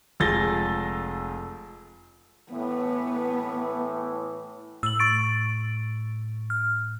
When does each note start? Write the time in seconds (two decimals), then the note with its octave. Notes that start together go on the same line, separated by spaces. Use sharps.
0.20 F1 F3 G#3 A6 A#6 G7
2.52 A2 E3 B3
4.83 A2 E6 F#7
4.99 C#6 A6 D7
6.50 F6